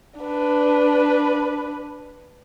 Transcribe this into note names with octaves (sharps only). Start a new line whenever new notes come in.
D4 B4